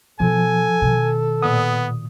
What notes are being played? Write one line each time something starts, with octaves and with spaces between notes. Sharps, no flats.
B2 F3 A4 G#5
B2 D#3
A#2 B3 D#6